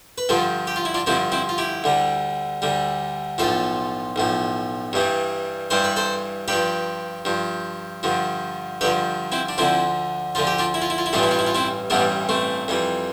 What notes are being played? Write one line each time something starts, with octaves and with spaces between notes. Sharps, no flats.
B4
G2 D3 F3 F4 A4
G4
F4
E4
D4 F4
G2 D3 F3 C4 E4
C4 E4
F4
E4 G4
D2 D3 G3
D2 D3 G3
B1 A2 F3 F4 A4
B1 A2 F3
G2 E3 G3
G2 E3 G3 C5
B4
A4 C5
G2 F3 G4 B4
G2 F3
G2 D3 F3
G2 D3 F3 G4 B4
C4 E4
D4
D2 D3 F3 C4 E4
D2 D3 F3 F4
G4
D4 F4
E4
F4
E4
F4
E4
A1 G2 E3 G3 F4
E4
F4
E4
F4
C4 E4
A1 G2 E3 G3 B3 D4
A3 C4
F2 E3 G3